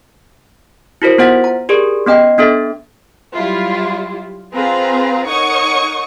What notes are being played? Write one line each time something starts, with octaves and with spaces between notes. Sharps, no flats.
E4 F#4 A#4 C5
B3 F4 C5 F#5 A6
A#5
G4 G#4 A#4 D5
B3 C#4 D#5 G5
B3 D4 A4 E5
F#3 G3 E4 F4
C4 F4 G#4 B4 F5 A#5
D#4 A#4 C#5 F#5 C#6 D#6